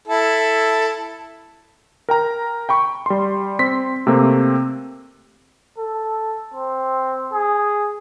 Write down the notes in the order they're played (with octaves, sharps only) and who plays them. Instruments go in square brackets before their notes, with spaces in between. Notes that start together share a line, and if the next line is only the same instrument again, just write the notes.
[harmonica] E4 A4
[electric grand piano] A#4 G5 A#5
G5 B5 C#6
G3 C6
C4 C6 B6
C3 A3 A#3 C4
[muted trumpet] A4
C4
G#4